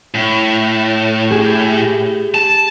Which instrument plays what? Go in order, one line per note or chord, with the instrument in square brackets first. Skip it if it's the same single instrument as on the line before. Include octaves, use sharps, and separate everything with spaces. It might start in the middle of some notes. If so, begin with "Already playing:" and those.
[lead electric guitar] A2
[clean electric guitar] G4 G#4
[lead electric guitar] A5